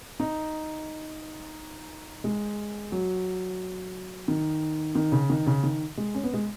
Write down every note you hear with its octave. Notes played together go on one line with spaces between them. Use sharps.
D#4
G#3
F#3
D#3
D#3
C#3
D#3
C#3
D#3
G#3
C#4
B3
G#3